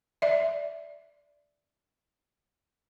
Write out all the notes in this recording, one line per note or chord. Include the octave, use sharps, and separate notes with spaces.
D5 E5